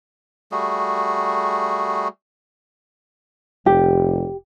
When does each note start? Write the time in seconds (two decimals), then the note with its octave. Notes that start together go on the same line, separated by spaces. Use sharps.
0.52 G3 A3 F#4 G#4
3.66 F1 G4